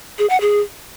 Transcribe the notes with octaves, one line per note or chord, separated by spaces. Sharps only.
G#4
F#5
G#4